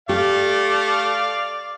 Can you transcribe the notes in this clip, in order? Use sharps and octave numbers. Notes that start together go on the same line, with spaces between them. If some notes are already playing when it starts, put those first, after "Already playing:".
A3 G4 D5 F5